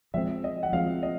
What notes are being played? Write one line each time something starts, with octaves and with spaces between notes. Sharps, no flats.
F3 G#3 C4 E5
D#5
F#5
F3 G#3 C4 F5
D#5